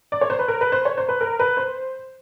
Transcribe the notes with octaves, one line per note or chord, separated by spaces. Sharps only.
D5
C#5
C5
B4
A#4
B4
C5
C#5
C5
B4
A#4
B4
C5